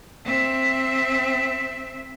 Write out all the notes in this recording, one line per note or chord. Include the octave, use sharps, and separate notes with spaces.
C4 E5